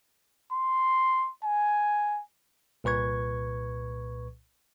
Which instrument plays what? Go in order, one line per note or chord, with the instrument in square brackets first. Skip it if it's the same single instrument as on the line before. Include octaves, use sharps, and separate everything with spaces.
[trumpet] C6
G#5
[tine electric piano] C2 A#2 B4 C#6 G#6